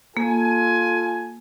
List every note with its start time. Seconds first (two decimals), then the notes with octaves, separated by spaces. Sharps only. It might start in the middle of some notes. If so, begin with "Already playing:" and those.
0.17 A#3 F4 A4 G#5